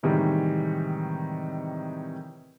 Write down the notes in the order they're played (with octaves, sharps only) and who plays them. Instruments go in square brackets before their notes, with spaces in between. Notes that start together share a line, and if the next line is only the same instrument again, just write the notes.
[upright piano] A2 C3 D#3 E3 G3 G#3